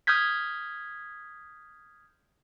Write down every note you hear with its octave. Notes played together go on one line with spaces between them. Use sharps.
D#6 F6 G6 G#6 B6